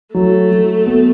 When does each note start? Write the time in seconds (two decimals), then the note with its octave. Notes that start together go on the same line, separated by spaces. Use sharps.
0.14 F#3 A3
0.51 F#3
0.86 B3